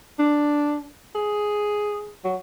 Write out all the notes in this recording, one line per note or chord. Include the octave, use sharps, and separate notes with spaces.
D4
G#4
F#3